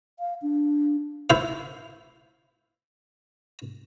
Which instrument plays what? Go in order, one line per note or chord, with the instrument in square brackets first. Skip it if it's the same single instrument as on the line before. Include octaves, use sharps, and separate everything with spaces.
[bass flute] F5
D4
[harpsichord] E4 C5 F5